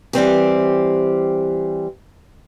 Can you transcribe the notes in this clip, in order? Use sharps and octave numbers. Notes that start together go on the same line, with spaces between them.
E3 G3 C4 G4